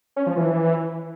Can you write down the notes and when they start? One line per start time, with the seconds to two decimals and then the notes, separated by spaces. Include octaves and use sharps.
0.16 C#4
0.27 F3
0.37 E3